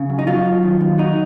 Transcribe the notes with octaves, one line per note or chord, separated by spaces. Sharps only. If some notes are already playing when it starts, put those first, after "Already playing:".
Already playing: C#3
F#2
D#4
F#3 F4
F#2
D#3
D#2
F#3 D#4